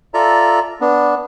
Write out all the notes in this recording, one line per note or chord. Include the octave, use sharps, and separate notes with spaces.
F4 A4 D5 E5 A#5
B3 D4